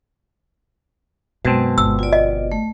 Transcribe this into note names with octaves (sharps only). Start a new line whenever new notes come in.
F#2 B2 G#3 C4 A5
G1 E6
F4 D5
D#5
A3